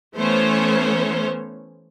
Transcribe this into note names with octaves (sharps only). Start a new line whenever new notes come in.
E3 A3 B3 C#4 C5 C#5